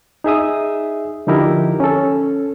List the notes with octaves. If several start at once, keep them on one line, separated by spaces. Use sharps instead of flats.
D#4 G#4 E5 D#6
D3 F3 D#4 E4 G4 A#4
C#4 A4